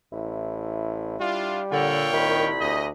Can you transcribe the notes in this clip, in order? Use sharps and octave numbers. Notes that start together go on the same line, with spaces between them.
A1 E4
G3 D4 F4
A#2 D3 C#5 F5 G5
C2 D#3 B5
D2 D#5